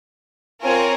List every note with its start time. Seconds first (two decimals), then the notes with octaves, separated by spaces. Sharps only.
0.62 C4 F4 A#4 C#5 G#5